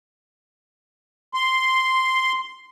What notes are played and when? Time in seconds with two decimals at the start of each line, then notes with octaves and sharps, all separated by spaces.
1.34 C6